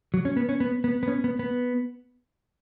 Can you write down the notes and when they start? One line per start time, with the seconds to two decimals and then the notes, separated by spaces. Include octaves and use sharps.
0.14 F#3
0.25 C#4
0.37 B3
0.49 C#4
0.60 B3
0.84 B3
1.03 B3
1.08 C#4
1.24 B3
1.39 B3